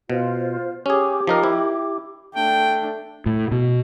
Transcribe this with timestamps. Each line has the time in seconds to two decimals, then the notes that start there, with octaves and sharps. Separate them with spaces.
0.10 B2 F4 C5 F5
0.86 C#4 G4 G#4 D6
1.27 F3 D#4 A#4
1.43 E4
2.35 A3 D4 G5
3.26 A2
3.51 B2